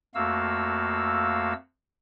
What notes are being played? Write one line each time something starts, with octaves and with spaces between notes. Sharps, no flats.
F2 A3 A#3 F#4 F5 E6